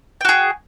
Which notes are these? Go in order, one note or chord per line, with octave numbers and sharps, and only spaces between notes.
F#4 G#4 G5